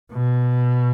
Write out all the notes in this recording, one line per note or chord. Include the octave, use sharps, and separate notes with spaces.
B2